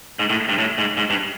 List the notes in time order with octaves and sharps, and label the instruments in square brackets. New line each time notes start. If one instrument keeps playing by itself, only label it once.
[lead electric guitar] G#2
A2
G2
A2
G#2
G#2
G2